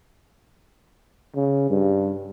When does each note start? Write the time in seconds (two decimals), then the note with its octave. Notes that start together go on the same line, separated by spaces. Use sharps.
1.36 C#3
1.70 G2